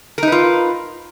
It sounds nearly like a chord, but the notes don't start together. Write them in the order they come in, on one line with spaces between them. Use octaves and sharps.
A#4 D#4 B4 F4